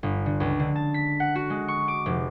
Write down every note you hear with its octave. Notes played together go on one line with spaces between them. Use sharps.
G1
D3
C#2
D3
A5
B6
F#5
F#4
G#3
C#6
D6
F1